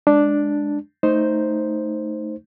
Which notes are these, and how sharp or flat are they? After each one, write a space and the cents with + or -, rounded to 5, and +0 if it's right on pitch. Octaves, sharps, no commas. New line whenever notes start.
G#3 +0 D4 +0
A3 +0 D#4 +0 C5 +0